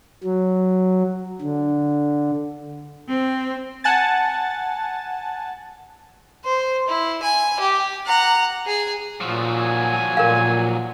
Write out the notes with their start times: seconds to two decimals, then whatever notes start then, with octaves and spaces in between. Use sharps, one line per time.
0.24 F#3
1.41 D3
3.08 C4
3.84 F#5 G#5 A5 A6
6.45 C5
6.88 E4
7.23 G#5
7.60 G4
8.06 F#5 A#5
8.66 G#4 G#5
9.21 A#2 F3 F#3 F4
9.54 G#5
10.17 A#2 A#4 F5